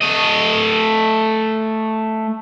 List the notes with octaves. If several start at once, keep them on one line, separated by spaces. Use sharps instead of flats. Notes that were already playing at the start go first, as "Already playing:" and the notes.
A3 D#5